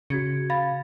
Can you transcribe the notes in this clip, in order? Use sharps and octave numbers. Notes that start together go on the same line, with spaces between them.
C#3 F#4 G#6 C#7
F5 B5 A6